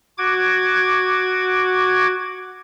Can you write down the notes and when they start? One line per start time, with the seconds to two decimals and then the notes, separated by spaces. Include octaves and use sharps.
0.18 F#4 D6 G#6